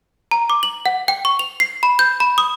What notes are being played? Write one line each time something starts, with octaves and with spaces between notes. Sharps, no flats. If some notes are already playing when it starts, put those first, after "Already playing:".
A#5
D6
F#7
F#5
G5
C#6
F7
C7
B5
G6
B5
D#6